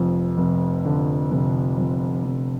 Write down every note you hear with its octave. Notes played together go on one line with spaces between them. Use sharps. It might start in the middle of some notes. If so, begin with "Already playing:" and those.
Already playing: F1 F2
F1
D3
F1
F2
F1